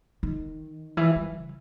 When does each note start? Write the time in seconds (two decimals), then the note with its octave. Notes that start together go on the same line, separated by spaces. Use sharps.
0.23 D#3
0.97 E3
1.16 G3
1.34 C#3